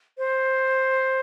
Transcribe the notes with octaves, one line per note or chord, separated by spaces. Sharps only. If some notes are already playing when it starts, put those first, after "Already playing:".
C5